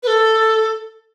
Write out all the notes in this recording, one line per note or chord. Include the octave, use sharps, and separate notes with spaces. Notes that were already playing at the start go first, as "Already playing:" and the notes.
B4
A4